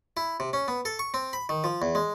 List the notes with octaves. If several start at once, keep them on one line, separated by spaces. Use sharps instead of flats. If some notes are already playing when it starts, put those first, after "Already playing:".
E4
C3
C#4
B3
A4
C#6
C4
B5
D#3
F3
E2
G#3